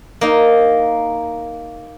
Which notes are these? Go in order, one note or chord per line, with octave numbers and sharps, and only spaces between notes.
A#3 D#4